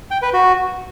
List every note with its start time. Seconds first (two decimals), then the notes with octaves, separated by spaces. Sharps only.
0.11 G5
0.22 B4
0.34 F#4